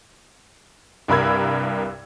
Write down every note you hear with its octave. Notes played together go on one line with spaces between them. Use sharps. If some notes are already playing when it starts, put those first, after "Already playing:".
C2 G2 A#4 B5 E6 G#6